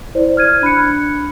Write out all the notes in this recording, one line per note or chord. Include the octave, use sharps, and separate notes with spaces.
E4 C5 D5
F6 G#6 D#7
D4 B5 F#6 C#7